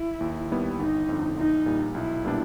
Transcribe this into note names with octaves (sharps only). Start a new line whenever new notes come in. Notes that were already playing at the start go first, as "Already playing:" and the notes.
Already playing: E4
D#2
D#3 G3 B3 E4
G1 D#4
F2 D3
A#1 D#4
A#2 G3
B1 E4
A#2 G3 B3 D4